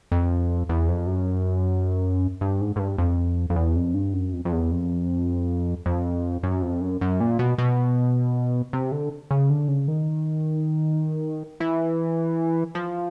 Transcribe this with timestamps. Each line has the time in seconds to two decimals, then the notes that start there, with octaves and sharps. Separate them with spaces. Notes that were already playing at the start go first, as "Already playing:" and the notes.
0.12 F2
0.69 E2
0.88 F2
1.07 F#2
2.41 G2
2.61 G#2
2.76 G#2
2.79 G2
2.98 F2
3.50 F2
3.56 E2
3.76 F2
3.94 G2
4.14 F#2
4.33 F2
4.45 F2
4.52 E2
4.71 F2
5.86 F2
6.43 F#2
6.62 F2
6.81 F#2
7.01 F#2
7.20 A#2
7.39 B2
7.58 B2
8.73 C3
8.92 D3
9.31 C#3
9.50 D3
9.68 C#3
9.88 D#3
11.60 E3
12.75 F3